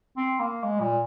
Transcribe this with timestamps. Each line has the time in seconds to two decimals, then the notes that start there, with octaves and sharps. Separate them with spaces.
0.17 C4
0.40 A#3
0.63 G#3
0.80 A#2